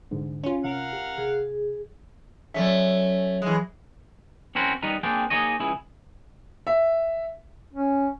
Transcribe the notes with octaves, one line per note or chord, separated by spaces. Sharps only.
C2 G#2 D3
C#4 F4
C3 A#4 F5 F#5
G4
C3 G#4
F#3 A3 C#4 D5 E5
E3 G#3
C4 C#4 E4 F#4 A#4 C5
G3 B3 D#4 A#4
A#3 C4 D4 G#4 G5
A#3 D#4 G#4 C#5 D#5
C#2 E4 G#4
E5
C#4